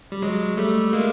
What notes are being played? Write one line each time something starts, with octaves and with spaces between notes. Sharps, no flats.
G3
F#3 G#3
G3 A3
A3
G#3 A#3